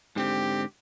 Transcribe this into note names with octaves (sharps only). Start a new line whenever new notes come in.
G#2 D3 C4 G4